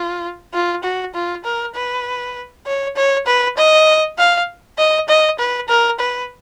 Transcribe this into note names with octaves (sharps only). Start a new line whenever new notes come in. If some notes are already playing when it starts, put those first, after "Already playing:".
Already playing: F4
F4
F#4
F4
A#4
B4
C#5
C#5
B4
D#5
F5
D#5
D#5
B4
A#4
B4